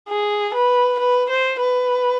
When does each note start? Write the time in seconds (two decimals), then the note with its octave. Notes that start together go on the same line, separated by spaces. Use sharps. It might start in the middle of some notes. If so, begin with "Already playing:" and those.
0.09 G#4
0.54 B4
0.99 B4
1.29 C5
1.60 B4